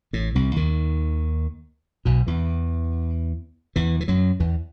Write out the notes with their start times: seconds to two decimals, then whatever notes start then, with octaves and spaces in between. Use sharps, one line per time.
0.13 A1 A2
0.35 C2 C3
0.56 D#2 D#3
2.05 B1 B2
2.27 E2 E3
3.76 E2 E3
4.00 E3
4.08 F#2 F#3
4.40 E2 E3